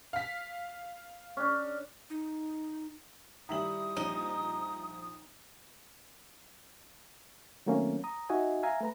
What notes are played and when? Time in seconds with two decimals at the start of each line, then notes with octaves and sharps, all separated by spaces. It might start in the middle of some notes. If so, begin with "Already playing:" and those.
0.13 F5 B6
1.37 C#4 D4
2.10 D#4
3.49 D#3 G3 E4 E5 A#5 D#6 F#7
3.96 A#1 F3 D#4 D#7
7.66 D#3 F#3 A3 A#3 C4 C#4
8.04 A#5 D#6
8.29 D#4 F#4 D#5 E5 G#5
8.63 E5 F5 G#5 A#5
8.81 A3 B4 A#5